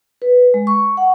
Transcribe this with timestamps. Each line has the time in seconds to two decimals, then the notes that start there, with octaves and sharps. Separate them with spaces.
0.22 B4
0.54 G#3
0.67 C#6
0.97 F#5